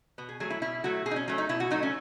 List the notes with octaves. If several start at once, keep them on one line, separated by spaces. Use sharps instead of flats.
B2 B3
G#4
F#3 A3 G#4
E4
B2 E4
F#3 A3 F#4
B2 G#4
D#4
C#4
F#3 A3 C#4
D#4
B2 E4
F#4
F#3 A3 D#4
C#4